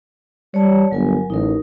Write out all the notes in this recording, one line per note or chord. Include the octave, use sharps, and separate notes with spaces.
G3 C#5 D5 A5
G1 F#3 A#4 G#5
A1 D#4 A#4